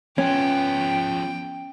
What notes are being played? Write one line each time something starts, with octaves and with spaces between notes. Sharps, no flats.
F3 B3 C#4 G5